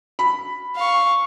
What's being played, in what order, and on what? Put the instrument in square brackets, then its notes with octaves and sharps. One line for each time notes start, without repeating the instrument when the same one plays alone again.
[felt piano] B5
[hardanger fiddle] F5 C#6